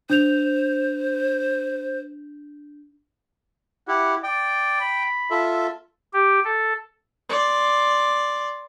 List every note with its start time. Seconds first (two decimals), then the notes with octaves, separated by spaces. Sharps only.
0.10 D4 C5 G6 F7
3.88 E4 G4 F#5
4.24 D5 G5
4.80 B5
5.30 F4 A4 E5
6.14 G4
6.44 A4
7.29 D5 C6